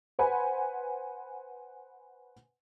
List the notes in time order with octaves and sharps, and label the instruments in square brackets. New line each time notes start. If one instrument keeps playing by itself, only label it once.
[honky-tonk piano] B4 C5 F#5 G#5 B5